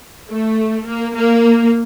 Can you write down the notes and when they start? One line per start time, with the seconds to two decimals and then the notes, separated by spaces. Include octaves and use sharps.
0.30 A3
0.87 A#3
1.15 A#3